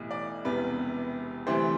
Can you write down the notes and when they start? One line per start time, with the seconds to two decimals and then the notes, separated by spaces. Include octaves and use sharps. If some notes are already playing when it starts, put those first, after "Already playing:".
Already playing: B1 A2 E3 G3
0.11 D5
0.45 E1 E2 C3 G3 B4
1.47 D2 C3 E3 G3 C5